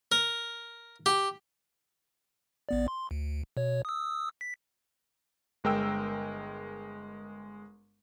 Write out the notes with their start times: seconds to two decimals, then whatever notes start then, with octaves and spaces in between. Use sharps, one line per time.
0.12 A#4
1.06 G4
2.69 A1 B3 D5
2.88 C6
3.11 D2
3.57 B2 C#5
3.85 D#6 E6
4.41 B6
5.64 G1 G#3 A#4 G5 E6